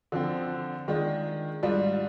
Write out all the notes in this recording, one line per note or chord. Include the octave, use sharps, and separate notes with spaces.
D3 F3 C4
D#3 G#3 D4 F4
G#2 G3 D4 F4